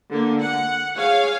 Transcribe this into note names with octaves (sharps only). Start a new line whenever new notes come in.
D3 A#3
F#5
G#4 C#5 F5 G#5